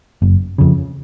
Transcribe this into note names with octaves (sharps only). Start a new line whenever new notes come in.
F#1
F2 C#3